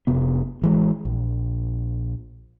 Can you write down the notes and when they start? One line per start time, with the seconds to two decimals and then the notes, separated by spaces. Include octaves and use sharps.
0.07 F1 C3 B3
0.62 A1 E3 G#3
1.05 A#1